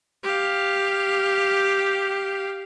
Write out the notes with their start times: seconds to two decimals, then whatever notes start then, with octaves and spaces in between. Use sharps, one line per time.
0.23 G4 F5